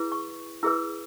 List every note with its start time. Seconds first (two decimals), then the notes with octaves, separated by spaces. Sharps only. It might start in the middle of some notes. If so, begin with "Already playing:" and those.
Already playing: E4 G#4 B4
0.12 C#6
0.63 E4 G#4 B4 E6